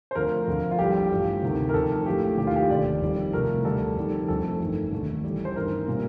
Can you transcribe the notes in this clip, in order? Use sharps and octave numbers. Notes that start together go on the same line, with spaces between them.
C5
F2 D3 F3 A3 A#4
F2 D3 F3 A3
F4
A#1 A2 G3 G4
A1 G2 F3 A3
D2 C3 D#3 A3
A#4
F2 D#3 A3 A4
A#1 A2 F3 A3 G4
D#2 D#3 A3 G4
F4
G4
F1 D#2 D3 D5
F2 D#3 G3
C2 C3 F3 A3 A#4
D2 D3 G3 A4
F2 D#3 G3
G1 F2 D3 A3 A4
A1 G2 D#3
D#2 D3 A3
A1 A2 G3
C5
A1 G2 D#3 A3 A#4
A#2 G3